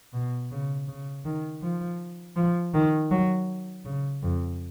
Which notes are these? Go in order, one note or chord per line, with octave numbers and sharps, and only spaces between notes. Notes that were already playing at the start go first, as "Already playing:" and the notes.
B2
C#3
C#3
D#3
F3
F3
D#3
F#3
C#3
F2